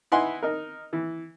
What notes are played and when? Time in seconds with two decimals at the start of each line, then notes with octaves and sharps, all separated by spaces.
0.12 D#4 E4 B4 F#5 G#5 C6
0.42 D#4 A#4
0.93 E3